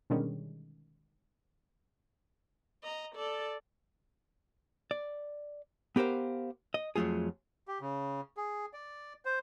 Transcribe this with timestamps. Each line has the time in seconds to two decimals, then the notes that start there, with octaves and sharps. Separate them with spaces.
0.10 B2 D3 D#3 G3 G#3 C#4
2.83 D#5 A#5
3.15 A4 D5
4.91 D5
5.96 B3 G4 A#4 C5 F5
6.74 D#5
6.96 F2 F#3 A3 F4 G#4
7.68 G4
7.81 C#3
8.37 G#4
8.73 D5
9.25 C5